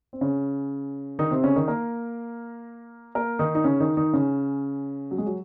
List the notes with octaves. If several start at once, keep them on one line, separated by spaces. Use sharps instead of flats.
C4
C#3 C#4
D#3 D#4
C3 C4
C#3 C#4
D#3 D#4
A#3 A#4
A#3 A#4
D#3 D#4
D#4
C#3 C#4
D#3 D#4
D#3 D#4
C#3 C#4
F#3
G#3
F#3